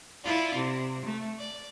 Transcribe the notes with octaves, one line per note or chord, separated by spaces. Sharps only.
E4 F4 D5
C3
A3
D5